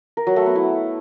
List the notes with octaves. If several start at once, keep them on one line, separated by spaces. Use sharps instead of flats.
A#4
F#3
A3
B3
E4